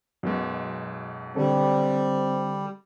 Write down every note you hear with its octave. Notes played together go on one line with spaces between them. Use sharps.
B1 F#2 B2 G#3
D3 G3 C4 A4